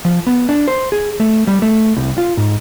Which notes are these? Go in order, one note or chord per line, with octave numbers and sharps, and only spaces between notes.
F3
B3
D4
C5
G#4
A3
G3
A3
C2
F4
G#2